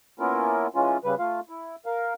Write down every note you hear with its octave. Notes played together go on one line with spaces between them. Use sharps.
A#3 B3 C#4 E4 F4 A#4
E3 G#3 C#4 F4
C#3 G3 B4
A3 F4 F5
E4
A#4 F5